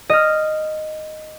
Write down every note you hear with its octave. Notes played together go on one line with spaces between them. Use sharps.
D#5 F6